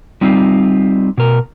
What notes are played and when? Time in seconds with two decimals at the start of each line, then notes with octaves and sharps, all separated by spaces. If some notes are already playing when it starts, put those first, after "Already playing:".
0.21 G3 C4 D#4 F4
1.18 B2 A#4